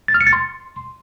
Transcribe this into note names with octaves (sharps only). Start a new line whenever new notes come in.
A6
F6
C#7
A6
C6